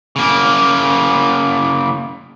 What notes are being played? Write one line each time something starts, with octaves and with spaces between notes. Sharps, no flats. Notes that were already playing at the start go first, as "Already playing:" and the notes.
C#3 A#3